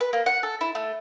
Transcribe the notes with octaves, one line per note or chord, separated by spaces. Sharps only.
B4
A#3
F#5
A4
E4
A3